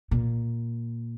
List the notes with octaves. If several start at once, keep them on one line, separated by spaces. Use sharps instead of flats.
A#2